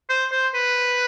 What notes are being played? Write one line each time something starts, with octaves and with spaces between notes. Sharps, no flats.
C5
C5
B4